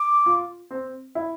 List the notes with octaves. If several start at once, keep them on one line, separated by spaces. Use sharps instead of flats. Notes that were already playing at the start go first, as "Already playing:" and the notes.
Already playing: D6
F4
C4
E4